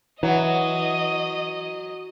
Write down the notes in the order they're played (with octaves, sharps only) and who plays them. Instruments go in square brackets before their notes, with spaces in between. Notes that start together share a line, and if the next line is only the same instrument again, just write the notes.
[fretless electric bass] E3 [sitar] F#3 [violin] D#5